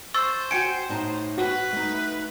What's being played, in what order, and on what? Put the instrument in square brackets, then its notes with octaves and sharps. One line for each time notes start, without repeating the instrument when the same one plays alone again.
[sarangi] C5 [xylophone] C#6 E6 A6
[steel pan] F#4 G5 G#5 [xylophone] C#7 D7
[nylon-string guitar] A2 D#4 A5
[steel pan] F#4 [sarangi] B4
[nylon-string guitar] A3 D#4